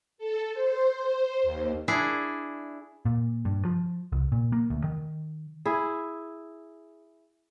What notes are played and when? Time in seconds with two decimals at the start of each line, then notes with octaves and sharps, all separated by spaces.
0.18 A4
0.54 C5
0.94 C5
1.43 D#2
1.88 D4 E4 G#4
3.05 A#2
3.45 G2
3.65 F3
4.12 C2
4.32 A#2
4.52 A#3
4.70 D2
4.84 D#3
5.65 E4 G#4